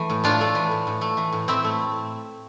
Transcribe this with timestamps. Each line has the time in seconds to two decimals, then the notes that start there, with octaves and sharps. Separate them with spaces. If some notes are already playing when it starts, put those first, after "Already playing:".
Already playing: E3 A3
0.10 A2
0.24 A2 D4 F4
0.41 A3
0.55 E3
0.71 A2
0.87 A2
1.01 A3
1.17 E3
1.33 A2
1.48 A2 C4 E4
1.64 A3